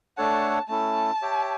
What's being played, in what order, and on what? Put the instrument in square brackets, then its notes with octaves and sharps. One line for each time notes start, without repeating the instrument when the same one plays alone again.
[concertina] A3 D4 A4 C#5 F#5 [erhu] A5
[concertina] A3 C#4 E4 A4 [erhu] A5
[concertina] G4 C#5 E5 G5